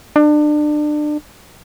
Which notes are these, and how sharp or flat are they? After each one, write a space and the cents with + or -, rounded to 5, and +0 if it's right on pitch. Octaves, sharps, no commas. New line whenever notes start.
D4 +30